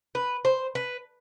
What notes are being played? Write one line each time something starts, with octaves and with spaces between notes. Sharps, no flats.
B4
C5
B4